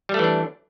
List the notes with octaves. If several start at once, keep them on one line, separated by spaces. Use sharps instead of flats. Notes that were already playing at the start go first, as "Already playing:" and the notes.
E3 G3 A3 D4